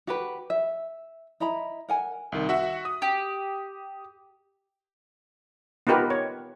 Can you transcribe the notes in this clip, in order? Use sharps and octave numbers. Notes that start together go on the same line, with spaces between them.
F#4 G4 B4
E5
E4 D#5 A#5 B5
A#4 F#5 G#5
C2 D#3
F#4 E5 F#5
D#6
G4
B3 D#4 F4 G4 A#4 B4
C#5